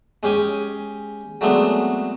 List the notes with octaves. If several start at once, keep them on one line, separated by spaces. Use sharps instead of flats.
G#3 C#4 G4 G#5
F#3 G#3 A3 B3 C4 D4